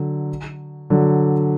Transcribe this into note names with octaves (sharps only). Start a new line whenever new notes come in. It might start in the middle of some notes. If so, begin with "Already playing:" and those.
Already playing: D3 F#3
D3 F#3